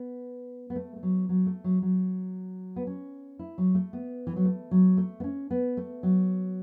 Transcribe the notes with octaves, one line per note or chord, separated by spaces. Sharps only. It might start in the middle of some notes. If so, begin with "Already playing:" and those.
Already playing: B3
B3
A3
A3
F#3
F#3
A3
F#3
F#3
B3
C#4
E4
F#3
A3
B3
E3
F#3
A3
F#3
A3
B3
C#4
B3
A3
F#3